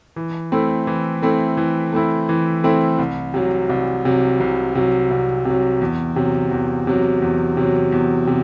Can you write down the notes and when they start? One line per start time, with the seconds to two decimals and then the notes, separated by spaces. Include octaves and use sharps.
0.16 E3
0.52 A3 C4 E4
0.87 E3
1.22 A3 C4 E4
1.57 E3
1.93 A3 C4 E4
2.29 E3
2.64 A3 C4 E4
2.98 C2
3.34 C3 F#3
3.70 C2
4.05 C3 F#3
4.40 C2
4.75 C3 F#3
5.11 C2
5.45 C3 F#3
5.81 E2
6.16 C3 F#3
6.52 E2
6.87 C3 F#3
7.22 E2
7.57 C3 F#3
7.92 E2
8.27 C3